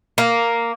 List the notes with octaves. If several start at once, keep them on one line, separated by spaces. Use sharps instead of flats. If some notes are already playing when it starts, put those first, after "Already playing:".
A#3